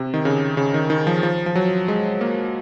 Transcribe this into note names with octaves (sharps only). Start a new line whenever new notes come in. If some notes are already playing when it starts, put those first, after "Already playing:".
Already playing: C3
D#3
C#3
C#3
D#3
D#3
F3
F3
F3
F#3
G#3
A#3